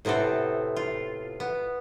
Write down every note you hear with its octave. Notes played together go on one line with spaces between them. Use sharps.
A2 C3 B3 C4 A4
F4
B3